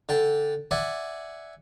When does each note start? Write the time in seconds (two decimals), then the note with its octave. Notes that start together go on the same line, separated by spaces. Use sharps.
0.09 D3 G5 A5
0.71 D5 E5 F#5 G#5